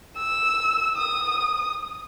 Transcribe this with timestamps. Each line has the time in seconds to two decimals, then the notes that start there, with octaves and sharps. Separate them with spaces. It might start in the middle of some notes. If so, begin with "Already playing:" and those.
0.17 E6
0.97 D#6